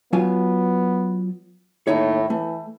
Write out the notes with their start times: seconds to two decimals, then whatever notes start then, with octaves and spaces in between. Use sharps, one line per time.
0.13 F#3 B3 F4 G#5
1.87 D#2 A2 D#4 C#5
2.30 E3 A3